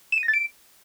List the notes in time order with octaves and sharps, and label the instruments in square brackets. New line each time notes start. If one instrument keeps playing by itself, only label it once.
[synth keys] E7
D#7
A#6
A6
D7